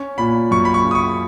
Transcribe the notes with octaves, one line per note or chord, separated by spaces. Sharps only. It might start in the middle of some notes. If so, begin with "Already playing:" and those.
Already playing: C#4
A#2 B5
F#2 C#6
B5
C#6
C#3
D#6
C#6